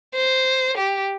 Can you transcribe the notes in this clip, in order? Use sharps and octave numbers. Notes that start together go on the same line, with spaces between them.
C5
G4